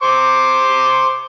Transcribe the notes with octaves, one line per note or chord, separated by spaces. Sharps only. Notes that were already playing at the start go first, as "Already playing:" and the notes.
C5 C6 D6